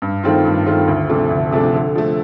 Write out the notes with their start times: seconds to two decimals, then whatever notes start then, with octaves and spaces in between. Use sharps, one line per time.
0.02 G2
0.23 D#3 A3 C4 F4
0.45 G2
0.66 D#3 A3 C4 F4
0.88 D2
1.09 C3 F3 A3 D4
1.30 D2
1.52 C3 F3 A3 D4
1.74 D3
1.95 F3 A3